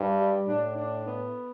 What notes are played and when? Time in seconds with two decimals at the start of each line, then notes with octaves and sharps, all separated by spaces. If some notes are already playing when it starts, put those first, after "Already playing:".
Already playing: G2
0.18 G3
0.47 A2 D4
0.77 D4
1.06 B3